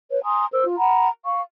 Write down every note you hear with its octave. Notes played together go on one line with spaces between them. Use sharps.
B4 C#5
G#5 A#5 C6 D#6
A#4 C5 E6
F4
F#5 A#5 B5
F5 C#6